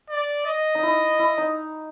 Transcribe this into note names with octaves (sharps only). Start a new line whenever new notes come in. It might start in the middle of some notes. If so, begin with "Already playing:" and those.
D5
D#5
D#4
E4
E4
D#4